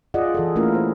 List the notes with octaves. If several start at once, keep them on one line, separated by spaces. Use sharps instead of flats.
F4 G#4 D5 D#5 F#5
E3 G#4 A4
A3 A#3 C#4 E4 F4 A#4
C5